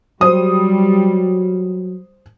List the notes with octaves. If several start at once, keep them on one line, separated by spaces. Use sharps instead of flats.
F#3 G3 C5 D#6